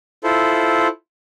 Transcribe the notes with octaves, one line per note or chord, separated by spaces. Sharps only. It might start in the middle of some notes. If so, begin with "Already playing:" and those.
E4 F4 A4 C5